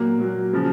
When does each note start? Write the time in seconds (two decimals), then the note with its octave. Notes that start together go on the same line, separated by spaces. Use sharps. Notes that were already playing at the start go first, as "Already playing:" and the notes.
Already playing: A#2 F#3 A#3
0.18 A#2 F#3
0.53 C#3 F3